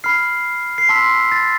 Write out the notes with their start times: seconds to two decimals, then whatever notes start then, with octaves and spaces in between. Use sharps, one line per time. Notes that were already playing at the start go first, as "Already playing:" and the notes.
0.04 B5 F6 C7
0.78 C7
0.89 A5 C6 E6 B6
1.32 A6